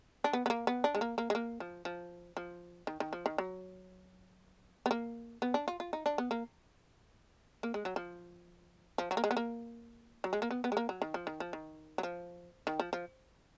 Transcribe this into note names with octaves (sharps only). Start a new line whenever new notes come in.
D4
B3
B3
A#3
B3
D4
G#3
A#3
A#3
G#3
A#3
F3
F3
F3
D#3
D#3
F3
D#3
F#3
B3
A#3
B3
D4
F4
F4
D#4
D4
B3
A#3
A#3
G#3
F#3
F3
F3
F#3
A#3
G#3
B3
A#3
F#3
G#3
A#3
B3
B3
G#3
A#3
F#3
D#3
F3
D#3
F3
D#3
F#3
F3
D#3
F3
F3